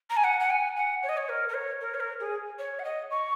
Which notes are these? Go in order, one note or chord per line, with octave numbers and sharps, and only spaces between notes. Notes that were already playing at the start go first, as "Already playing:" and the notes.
A#5
G#5
F#5
F#5
G#5
F#5
C#5
D#5
C#5
A#4
A#4
C#5
A#4
C#5
A#4
G#4
C#5
F#5
D#5
C#6